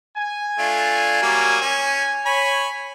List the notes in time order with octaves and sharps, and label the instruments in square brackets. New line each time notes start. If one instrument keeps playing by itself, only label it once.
[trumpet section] G#5
[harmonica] A3 D4 F4
F#3 G3 A#3
C#4
[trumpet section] C#5 [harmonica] G#5 B5